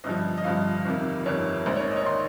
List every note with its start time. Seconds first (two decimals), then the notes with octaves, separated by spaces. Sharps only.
0.04 G1 G2 F3 D#5
0.38 D#5
0.44 G1 G2 F3 F5
0.85 G1 F2 C3 D#3
1.26 G1 F2 C3 D#3 C#5
1.66 A#1 G#2 D#3 C5
1.76 C#5
1.91 D#5
1.96 C#5
2.06 D#3 C6